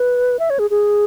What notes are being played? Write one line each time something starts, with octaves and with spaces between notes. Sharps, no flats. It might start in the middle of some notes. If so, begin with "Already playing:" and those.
Already playing: B4
E5
C#5
G#4
G#4